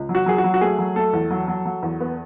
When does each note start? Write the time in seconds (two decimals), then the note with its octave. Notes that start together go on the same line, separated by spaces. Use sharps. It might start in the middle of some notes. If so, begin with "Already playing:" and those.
Already playing: C#2
0.09 F#3
0.15 F#4
0.26 F#3 G#4
0.38 F#4
0.44 F#3
0.54 F#4
0.61 A3 G#4
0.79 F#3
0.96 A3 A4
1.13 E2
1.31 F#3
1.48 F#3
1.65 F#3
1.83 E2
2.00 B3